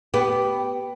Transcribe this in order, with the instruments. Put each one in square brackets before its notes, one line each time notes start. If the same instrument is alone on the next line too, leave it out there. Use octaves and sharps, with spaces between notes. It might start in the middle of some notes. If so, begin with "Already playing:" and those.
[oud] B3 G4